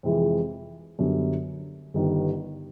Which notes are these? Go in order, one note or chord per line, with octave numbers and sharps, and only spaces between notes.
F2 C3 E3 G#3
F#2 D3 G3 B3
G1 G2 D#3 G3